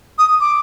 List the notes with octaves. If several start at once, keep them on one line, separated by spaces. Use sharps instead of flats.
D#6
D6